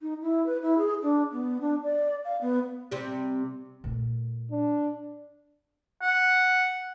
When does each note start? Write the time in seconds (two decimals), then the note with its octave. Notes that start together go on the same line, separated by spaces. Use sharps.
0.01 D#4
0.22 E4
0.46 B4
0.62 E4
0.78 G#4
1.03 D4
1.32 B3
1.61 D4
1.83 D5
2.25 F5
2.41 B3
2.91 C3 G3
3.84 A#2 A3
4.51 D4
6.02 F#5